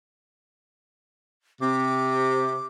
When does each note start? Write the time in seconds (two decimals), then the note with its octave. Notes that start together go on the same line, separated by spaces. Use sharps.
1.61 C3 D6